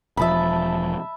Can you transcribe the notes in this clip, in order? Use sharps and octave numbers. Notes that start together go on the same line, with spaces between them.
E1 F3 E5 A5 B5